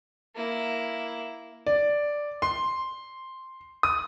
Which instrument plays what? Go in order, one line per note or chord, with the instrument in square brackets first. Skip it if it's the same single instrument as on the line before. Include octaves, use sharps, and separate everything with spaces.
[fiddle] A#3 E4
[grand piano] D5
C6
D#6